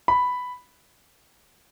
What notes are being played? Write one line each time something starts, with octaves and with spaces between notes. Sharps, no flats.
B5